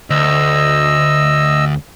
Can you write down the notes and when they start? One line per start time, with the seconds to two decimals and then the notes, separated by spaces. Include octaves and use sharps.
0.10 D2 D#5 E6